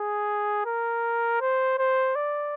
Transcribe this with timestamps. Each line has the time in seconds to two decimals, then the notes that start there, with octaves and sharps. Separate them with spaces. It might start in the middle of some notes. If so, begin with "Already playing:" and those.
Already playing: G#4
0.66 A#4
1.41 C5
1.78 C5
2.15 D5